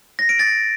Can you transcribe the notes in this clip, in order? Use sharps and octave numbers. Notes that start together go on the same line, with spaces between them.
A#6
D7
A6